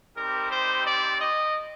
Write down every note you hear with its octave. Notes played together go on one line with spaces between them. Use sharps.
G3 C4 D#4 G4 A#4
C5
D5
D#5